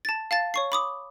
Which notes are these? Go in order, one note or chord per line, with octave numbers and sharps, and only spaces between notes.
A5 A6
F5 A5 A6
C#5 C#6 C7
B5 D6 D#6